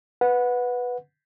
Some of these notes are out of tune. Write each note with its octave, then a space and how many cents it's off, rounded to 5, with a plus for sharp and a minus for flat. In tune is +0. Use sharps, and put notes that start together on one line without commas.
B4 +0 F#5 -20